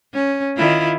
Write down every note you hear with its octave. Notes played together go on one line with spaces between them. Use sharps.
C#4
D#3 E4 F4